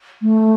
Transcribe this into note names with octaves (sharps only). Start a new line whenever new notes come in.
A3